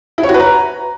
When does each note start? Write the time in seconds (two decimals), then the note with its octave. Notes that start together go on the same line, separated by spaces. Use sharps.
0.18 E4
0.23 C#5
0.29 F#4
0.34 B4
0.40 A#5